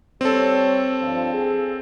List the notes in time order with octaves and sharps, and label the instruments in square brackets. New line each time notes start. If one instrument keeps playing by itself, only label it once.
[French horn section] G3 C#5 [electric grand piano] C4 A4
[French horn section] G2 F3
G#4